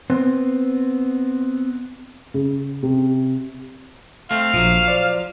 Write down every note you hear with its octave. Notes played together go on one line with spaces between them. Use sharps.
B3 C4
C#3
C3
A3 C4 F5
A#1 F3 F#3
C5 D5